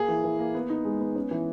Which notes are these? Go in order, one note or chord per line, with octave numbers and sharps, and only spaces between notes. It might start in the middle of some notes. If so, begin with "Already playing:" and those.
Already playing: A#3 G#4
E3
E3
A#3
B3
D#4
G#3
B3
C#4
E3